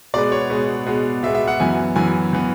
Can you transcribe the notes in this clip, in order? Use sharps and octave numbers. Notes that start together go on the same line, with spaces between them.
B2 G#3 B3 D5
C#5
B2 G#3 B3
B2 G#3 B3
B2 G#3 B3 E5
E5
F#5
F#2 E3 B3 G#5
F#2 E3 B3 G#5
E3 B3